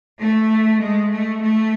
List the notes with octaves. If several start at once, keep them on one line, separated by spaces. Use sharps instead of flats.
A3
G#3
A3
A3